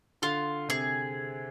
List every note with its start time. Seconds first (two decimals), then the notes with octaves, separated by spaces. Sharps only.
0.22 D3 F4
0.69 C3 G#4